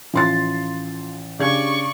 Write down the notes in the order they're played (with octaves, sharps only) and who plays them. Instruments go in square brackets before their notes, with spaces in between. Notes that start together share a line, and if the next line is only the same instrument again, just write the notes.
[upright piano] A1 [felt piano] F3 C6 A6
[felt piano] C#3 G#6 [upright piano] D4 G4 [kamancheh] D5 C#6